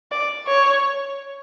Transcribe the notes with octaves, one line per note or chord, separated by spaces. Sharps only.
D5
C#5